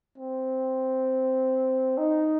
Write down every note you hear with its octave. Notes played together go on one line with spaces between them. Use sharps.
C4
D#4